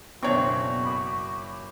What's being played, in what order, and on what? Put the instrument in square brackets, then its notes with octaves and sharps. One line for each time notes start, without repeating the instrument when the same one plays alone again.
[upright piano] F#1 C#5 C#6 [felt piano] B2 [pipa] C4 D4 [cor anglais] F#4
[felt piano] B5 D6